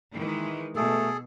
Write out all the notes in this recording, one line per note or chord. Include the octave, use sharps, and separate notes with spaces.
D#3 E3 G#3
B2 A3 G#4 A4